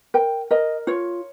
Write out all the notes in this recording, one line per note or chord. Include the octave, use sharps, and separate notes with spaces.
A#4 G5
A#4 D#5
F4 C#5